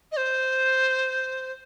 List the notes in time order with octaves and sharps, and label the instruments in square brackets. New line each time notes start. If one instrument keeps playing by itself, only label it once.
[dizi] D#5
C5